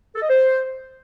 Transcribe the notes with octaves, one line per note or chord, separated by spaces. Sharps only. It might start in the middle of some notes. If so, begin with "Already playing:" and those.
A4
D#5
C5